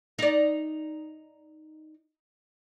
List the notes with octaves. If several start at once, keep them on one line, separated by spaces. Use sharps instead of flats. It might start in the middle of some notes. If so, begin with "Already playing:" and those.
D#4 D5